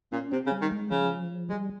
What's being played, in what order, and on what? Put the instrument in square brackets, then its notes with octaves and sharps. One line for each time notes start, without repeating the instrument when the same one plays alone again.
[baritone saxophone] A#2 [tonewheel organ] C#4
[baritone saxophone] C3 [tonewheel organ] C4
[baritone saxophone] C#3
[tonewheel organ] G3
[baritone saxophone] D#3
[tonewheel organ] G#3
[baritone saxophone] C#3 [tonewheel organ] F3
[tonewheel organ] G3 [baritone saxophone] G#3